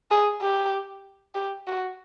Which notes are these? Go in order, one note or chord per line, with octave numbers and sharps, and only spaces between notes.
G#4
G4
G4
F#4